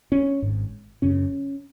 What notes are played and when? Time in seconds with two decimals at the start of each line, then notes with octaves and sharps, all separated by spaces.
0.12 C#4
0.42 G#1 G#2
1.02 F#1 F#2 C#3 C#4